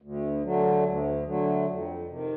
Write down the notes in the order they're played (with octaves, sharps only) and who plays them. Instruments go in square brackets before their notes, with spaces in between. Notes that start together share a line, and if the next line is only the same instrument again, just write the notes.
[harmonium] D2
D3 F#3 A3
D2
D3 F#3 A3
F2
C3 D#3